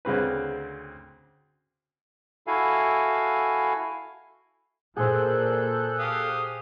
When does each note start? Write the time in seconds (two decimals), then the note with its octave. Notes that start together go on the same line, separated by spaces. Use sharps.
0.05 D2 C#3 C4 B4
2.47 E4 F#4 A4 F5 G#5
4.96 A#2 G#4 A4 C5 F#6 G6
5.99 G4 F5 D#6